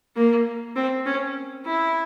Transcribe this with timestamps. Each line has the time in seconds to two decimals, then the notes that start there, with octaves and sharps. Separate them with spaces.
0.16 A#3
0.76 C4
1.05 C#4
1.65 E4